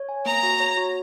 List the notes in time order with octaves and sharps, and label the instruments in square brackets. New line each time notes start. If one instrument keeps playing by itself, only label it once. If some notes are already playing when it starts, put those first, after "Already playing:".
Already playing: [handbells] C#5
G#5
[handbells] A#3 [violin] A#5
[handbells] F#4
C#5
F#4